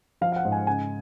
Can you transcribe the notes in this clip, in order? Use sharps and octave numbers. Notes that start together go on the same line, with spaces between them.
F3 F5
F5
F#5
G#2
G#5
C#3 G#5